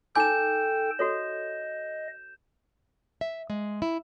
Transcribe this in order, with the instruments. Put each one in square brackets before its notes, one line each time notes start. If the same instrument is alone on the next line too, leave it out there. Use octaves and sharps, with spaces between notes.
[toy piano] D#4 G#5 D6 [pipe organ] A4 G5 [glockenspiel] G6 E7
[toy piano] F#4 A4 C#5 [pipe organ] D#5
[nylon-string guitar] E5
G#3
E4